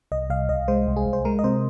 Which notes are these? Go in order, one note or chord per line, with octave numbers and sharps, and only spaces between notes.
C2 D#5
C2 F5
C2 D#5
G#3 C5
C2
G#4
C2
C5
G#3 A#4
D#5
C3 C5